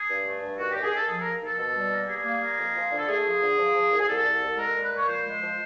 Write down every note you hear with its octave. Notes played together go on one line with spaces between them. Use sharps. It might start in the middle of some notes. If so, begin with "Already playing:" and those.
Already playing: G#4
G2
A3
G2
D#2 F#4
D#2 G4
G#4
D#2 A4
F3 G#4
D#2 A#4
D#2 A4
B2
G3
A#3
G3 G#4
A#3
A#3
F2
F3
D3
A4
A3 G#4
F3
D3
F3
F3
C2
G#4
C2 A4
C2
C2
G#3 A#4
A#2
B4
A#2
C#5
F3 C5
G#3
F3